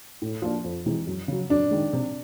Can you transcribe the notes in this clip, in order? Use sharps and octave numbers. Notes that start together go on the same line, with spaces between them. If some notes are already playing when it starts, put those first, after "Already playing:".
A2
F3 A#3 D4 F4
F2
C3 E3 G#3
F#2
C#3 F#3
F#2 D4
D#3 G#3
C3